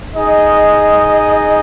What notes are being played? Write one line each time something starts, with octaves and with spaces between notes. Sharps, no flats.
D#4 G#4 D#5